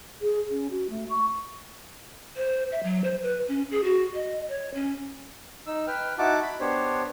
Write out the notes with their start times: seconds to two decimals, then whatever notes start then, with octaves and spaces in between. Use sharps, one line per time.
0.21 G#4
0.51 C#4
0.71 F#4
0.90 A3
1.10 C#6
2.37 C5
2.72 E5
2.83 F#3
3.04 C5
3.23 B4
3.48 C#4
3.71 G#4
3.84 F#4
4.14 D#5
4.48 C#5
4.74 C#4
5.67 D#4 E6
5.87 B4 G5 F6
6.18 D#4 E4 F#4 F#5 A5 D6
6.43 B5
6.60 B3 D4 G4 C5 C#5